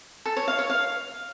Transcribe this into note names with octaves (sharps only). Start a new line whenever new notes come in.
A4
C#5
F5
C#5
F5